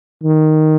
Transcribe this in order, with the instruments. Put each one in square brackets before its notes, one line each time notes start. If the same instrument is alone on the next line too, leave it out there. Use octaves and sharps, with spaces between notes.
[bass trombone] D#3